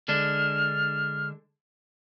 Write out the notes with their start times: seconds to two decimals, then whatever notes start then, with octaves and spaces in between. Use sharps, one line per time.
0.08 D3 G#3 D4 F6